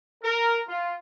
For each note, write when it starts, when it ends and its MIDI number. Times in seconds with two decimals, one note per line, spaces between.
0.23 0.60 70
0.68 0.94 65